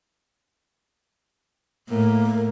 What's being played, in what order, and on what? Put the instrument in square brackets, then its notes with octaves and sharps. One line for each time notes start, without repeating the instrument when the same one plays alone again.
[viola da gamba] A2 [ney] A#3